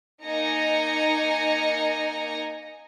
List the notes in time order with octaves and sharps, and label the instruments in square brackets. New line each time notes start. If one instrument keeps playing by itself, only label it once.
[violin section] A#3 D#4 G#5 A#5 A#6 C#7